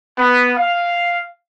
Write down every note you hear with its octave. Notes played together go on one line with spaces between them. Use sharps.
B3
F5